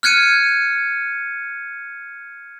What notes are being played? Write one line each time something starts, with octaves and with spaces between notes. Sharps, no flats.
F6 F#6 G#6 C#7 D#7